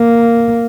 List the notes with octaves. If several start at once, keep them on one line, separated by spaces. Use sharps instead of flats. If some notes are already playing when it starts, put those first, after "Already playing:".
Already playing: A#3